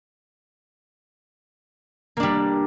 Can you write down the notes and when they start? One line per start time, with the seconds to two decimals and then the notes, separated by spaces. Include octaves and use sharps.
2.17 A#3
2.20 D4
2.23 G3